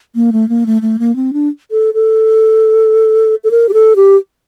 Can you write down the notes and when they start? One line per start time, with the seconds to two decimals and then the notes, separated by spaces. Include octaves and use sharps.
0.15 A#3
0.32 A3
0.49 A#3
0.66 A3
0.82 A3
0.99 A#3
1.16 C4
1.33 D4
1.71 A4
1.94 A4
3.44 A4
3.51 A#4
3.69 G4
3.73 A4
3.96 G4